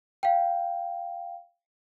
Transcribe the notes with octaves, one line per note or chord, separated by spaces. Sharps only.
F5 G5